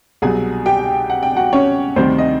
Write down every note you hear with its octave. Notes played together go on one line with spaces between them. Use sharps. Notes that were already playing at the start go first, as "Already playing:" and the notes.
C2 B2 F#3 G#4 G#5
G4 G5
F#5
G5
F#4 F#5
C#4 C#5
D2 C3 D#3 G3 C4 C5
D#5